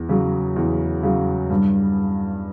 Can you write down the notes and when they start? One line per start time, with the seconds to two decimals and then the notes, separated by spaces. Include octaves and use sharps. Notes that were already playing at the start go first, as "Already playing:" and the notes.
Already playing: E2
0.09 C#3 F#3
0.56 E2
1.03 C#3 F#3
1.50 G2